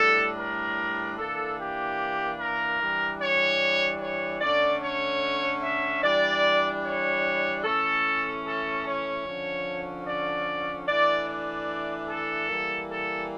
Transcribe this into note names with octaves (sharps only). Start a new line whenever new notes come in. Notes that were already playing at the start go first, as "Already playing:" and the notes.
Already playing: A2 G3 D4 A4
A#4
E3 A#3 D4 A4
G4
A#4
E3 G3 D4
C#5
C#5
D3 A3 C#4 D5
C#5
E5
E3 G3 D4 D5
C#5
E3 A3 C#4 A4
A4
C#5
D3 F3 C#4
D5
E3 A3 D4 D5
D5
A4
E3 G3 A#3
A4